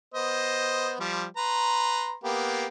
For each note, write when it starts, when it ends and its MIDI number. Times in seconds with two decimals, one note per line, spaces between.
0.14 0.95 59
0.14 0.95 72
0.14 0.95 75
1.00 1.25 53
1.00 1.25 55
1.37 2.14 71
1.37 2.14 82
1.37 2.14 84
2.24 2.67 58
2.24 2.67 59
2.24 2.67 67